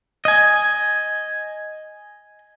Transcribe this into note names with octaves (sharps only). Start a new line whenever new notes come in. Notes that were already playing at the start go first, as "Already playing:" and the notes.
D#5 G#5